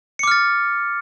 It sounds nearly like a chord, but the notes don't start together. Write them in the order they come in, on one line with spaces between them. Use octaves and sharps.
C#7 D6 F6 A6